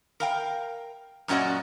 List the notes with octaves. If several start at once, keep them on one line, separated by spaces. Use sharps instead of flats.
A#4 F5 G5
F#2 A#2 C#4 F#4 D5 D#5